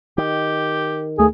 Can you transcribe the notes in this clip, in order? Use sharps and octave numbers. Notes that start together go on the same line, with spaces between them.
D#3 G4
D2 A3 G#4